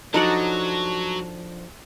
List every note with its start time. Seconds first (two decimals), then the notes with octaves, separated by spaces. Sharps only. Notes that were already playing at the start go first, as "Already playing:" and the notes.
0.14 F3 F#3 D4 D#4 F#4 A4 D5